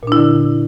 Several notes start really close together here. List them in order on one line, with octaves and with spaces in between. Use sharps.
A#2 D4 E4 D3